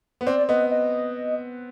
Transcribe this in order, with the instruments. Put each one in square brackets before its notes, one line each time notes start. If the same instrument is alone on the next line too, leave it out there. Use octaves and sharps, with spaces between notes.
[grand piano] B3
[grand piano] C4 [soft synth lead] D5
[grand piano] B3 [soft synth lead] D#5
[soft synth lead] D#5